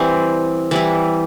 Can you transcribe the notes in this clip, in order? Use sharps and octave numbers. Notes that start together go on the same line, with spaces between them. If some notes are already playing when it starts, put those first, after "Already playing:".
Already playing: E3 G3 C4
E3 G3 E4